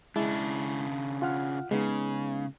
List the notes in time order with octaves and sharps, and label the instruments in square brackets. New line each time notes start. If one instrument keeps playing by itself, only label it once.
[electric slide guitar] C#3 D4 [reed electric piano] G#3 E4
[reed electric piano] F4 F#5 F6
[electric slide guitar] C#3 [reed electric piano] G#3 B3 D#4